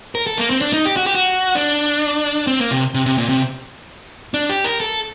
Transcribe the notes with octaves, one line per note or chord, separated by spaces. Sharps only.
A#4
A4
A#3
C4
D4
D#4
G4
F#4
G4
F#4
D4
C4
A#3
C3
C3
C3
A#2
C3
D4
G4
A#4
A4